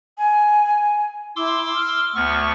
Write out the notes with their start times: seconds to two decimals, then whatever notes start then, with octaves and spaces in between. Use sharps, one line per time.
0.18 G#5
1.36 E4 C6 D6 E6
1.75 F6
2.15 D2 B3 C#6